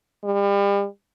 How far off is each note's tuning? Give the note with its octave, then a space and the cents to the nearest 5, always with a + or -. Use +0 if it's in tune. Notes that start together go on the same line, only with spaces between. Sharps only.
G3 +35